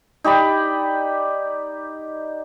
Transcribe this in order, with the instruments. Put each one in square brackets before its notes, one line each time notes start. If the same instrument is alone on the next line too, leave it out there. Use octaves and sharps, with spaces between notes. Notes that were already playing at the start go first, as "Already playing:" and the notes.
[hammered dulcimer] D#4 G4 D5 B5